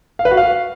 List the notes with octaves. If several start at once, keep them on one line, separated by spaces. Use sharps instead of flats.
F5
B4
F#4
F5